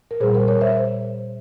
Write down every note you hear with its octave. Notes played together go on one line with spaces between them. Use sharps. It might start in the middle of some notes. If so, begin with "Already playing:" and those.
A#4
A#2 G3 G#4 C5
A#4
A#4 C#5
C5 E5